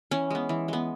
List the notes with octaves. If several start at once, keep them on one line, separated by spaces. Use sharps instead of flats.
E3 C#4
G#3 B3
E3
G#3 B3